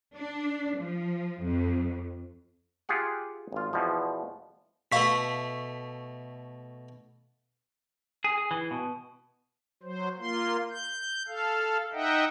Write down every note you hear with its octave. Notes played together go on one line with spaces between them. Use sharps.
D4
F3
F2
F4 G4 G#4 F#5
G#1 F4
E2 B2 F3
B2 A3 F5 C#6 B6
G#4
G#4
E3
B2
F#3 C5
A#3 F4 C6
G6
A4 F5
D#4 D#5 E5 F#5 G5